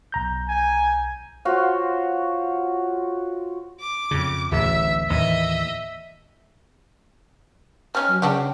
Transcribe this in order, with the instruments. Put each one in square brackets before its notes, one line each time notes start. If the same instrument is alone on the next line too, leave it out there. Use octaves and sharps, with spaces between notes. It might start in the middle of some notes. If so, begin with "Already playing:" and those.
[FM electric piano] B1 A#5 G6
[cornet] G#5
[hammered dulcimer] F4 F#4 C5 C#5
[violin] D6
[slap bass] F2 C#3
[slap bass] D1 A1 [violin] E5
[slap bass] D#2 A2 E3 [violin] D#5 E5
[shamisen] G3 C#4 D#4 [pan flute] F6
[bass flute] F#3
[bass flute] C#3 [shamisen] D4 F#4 G4 [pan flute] G5